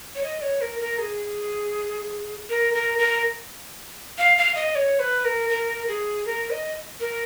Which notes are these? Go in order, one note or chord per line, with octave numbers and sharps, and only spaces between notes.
C#5
D#5
C#5
A#4
A#4
G#4
A#4
A#4
A#4
F5
F5
D#5
C#5
B4
A#4
A#4
G#4
A#4
D#5
A#4